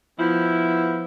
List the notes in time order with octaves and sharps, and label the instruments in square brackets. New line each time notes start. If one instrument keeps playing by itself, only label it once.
[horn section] F3 B3 E4